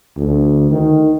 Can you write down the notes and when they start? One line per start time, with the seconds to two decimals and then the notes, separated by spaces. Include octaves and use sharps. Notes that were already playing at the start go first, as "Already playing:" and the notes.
0.17 D2
0.71 D#3